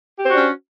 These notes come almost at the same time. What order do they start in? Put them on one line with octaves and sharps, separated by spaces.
G4 C5 F#4 D4 C#4